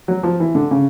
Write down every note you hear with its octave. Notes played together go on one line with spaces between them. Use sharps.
F#3
F3
E3
D3
C#3